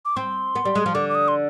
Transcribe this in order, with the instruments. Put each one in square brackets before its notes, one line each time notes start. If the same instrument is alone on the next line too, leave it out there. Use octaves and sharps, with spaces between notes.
[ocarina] D6
[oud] C4 [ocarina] C6
[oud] B3
G3
G#3
F3
[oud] D3 [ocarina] D6
[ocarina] D6
D#6
C6